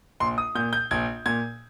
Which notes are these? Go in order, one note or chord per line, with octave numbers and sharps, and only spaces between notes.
A#1 C6
D#6
A#2 G6
G6
A#1 G#6
A#2 G#6